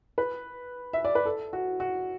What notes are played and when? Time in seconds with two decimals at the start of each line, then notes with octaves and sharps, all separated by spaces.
0.18 B4
0.93 E5
1.05 D5
1.15 B4
1.25 A4
1.53 F#4
1.80 F#4